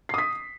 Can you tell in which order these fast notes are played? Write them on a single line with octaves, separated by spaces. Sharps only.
C7 D#6 B6